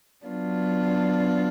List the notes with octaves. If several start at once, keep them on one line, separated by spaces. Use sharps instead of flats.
F#3 B3 D4 F4